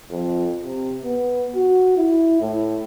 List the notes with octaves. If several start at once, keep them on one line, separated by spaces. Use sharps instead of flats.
F2
C3
B3
F#4
E4
A2